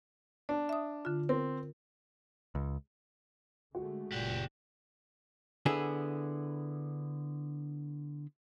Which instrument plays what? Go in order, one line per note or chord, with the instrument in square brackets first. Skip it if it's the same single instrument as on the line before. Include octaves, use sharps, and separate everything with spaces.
[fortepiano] D4 [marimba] D5
[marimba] E5 D#6
D3 F4
[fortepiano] C4 [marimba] A#4
[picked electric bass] C#2
[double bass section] D3 G#3 A3 [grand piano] F#4
[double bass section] F#1 [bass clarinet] A#2 [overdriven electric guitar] G4 F#5
[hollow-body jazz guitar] D3 B3 E4 G#4